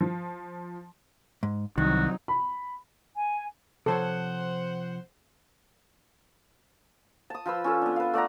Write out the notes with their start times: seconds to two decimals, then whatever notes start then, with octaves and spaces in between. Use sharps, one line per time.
0.01 F3
1.43 G#2
1.78 C2 D#3 F#3 D#4 F#4
2.28 B5
3.15 G#5
3.86 C3 F3 A4 C5 C#5 F#5
7.30 A5 D#6
7.46 F3 F4 B4 E6
7.64 C#4 F4 A4
7.82 B3 D4
7.96 B4 F5
8.14 A3 D5 F#5 A#5